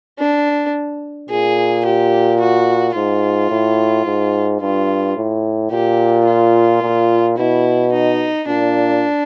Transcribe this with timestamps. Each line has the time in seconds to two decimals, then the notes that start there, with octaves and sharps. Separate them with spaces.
0.19 D4
1.29 A#2 G#4
1.85 G4
2.40 F#4
2.95 G#2 F4
3.50 A2
4.06 G#2
4.61 G2 F4
5.16 A2
5.71 A#2 G4
6.27 F4
6.82 A#2
7.37 B2 E4
7.92 D#4
8.47 A#2 D4